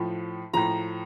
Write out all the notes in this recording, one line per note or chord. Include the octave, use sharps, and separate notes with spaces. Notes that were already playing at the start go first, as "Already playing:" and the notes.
Already playing: A2 F3
A2 F3 A#5